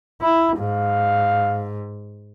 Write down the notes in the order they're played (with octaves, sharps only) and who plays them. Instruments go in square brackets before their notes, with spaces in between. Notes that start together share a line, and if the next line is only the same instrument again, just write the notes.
[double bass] E4
[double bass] G#2 [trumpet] F5